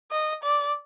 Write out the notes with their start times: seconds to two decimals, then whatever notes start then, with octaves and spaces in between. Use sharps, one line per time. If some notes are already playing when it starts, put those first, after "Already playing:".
0.11 D#5
0.43 D5